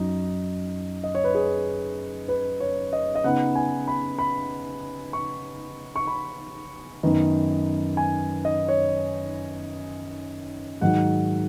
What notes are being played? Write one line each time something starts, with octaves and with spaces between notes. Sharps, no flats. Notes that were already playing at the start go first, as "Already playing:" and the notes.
Already playing: F#2 F#3 D#4
D#5
C#5
B4
G#4
B4
C#5
D#5
D#5
C#3 B3 D#4 F#5
G#5
B5
B5
C#6
C#6
B5
F#2 D#3 B3 D#4
G#5
D#5
C#5
G#2 D#3 F#3 F#5